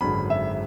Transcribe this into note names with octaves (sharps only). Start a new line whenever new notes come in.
G#1 F#2 D3 G#3 B5
E5